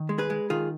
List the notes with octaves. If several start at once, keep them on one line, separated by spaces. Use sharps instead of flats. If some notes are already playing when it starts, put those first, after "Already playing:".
Already playing: D#3
G#3
G#4 B4
G#3
D#3 F4 G#4